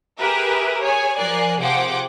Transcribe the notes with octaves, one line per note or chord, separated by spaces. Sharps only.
G4 G#4 A#4 B4 E5
G#4 C#5 G#5
F3 A#4 D5 G#5 F#6 C7
C3 F3 G#4 F#5 G5 D6